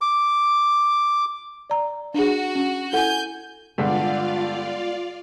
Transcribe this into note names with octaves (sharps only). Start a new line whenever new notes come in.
D6
D5 A#5
D4 F#4 G#4
C#4
E4 A4 F#5 G#5 G6
G2 D3 G#3 B3 F4 D5 F5 F#5